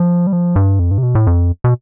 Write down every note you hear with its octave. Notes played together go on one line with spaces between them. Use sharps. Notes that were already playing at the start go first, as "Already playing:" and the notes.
Already playing: F3
G3
F3
G2
F2
G2
C3
B2
A2
F2
B2